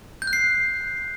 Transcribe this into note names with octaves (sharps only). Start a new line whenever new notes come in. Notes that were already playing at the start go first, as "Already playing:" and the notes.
G6
F#6
C7